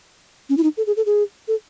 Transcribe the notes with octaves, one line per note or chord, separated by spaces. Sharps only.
C#4
E4
D#4
A4
G#4
A4
G#4
A4